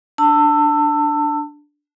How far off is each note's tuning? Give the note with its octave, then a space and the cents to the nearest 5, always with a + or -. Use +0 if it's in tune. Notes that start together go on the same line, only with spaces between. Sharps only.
D4 +0 A5 +30 E6 +5